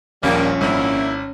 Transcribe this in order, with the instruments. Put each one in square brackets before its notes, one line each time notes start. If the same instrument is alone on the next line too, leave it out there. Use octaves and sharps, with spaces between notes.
[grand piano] D#1 [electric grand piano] A#1 F3 [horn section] G3 A#3 [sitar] C#4
[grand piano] G#1 [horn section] A#3 D4 E4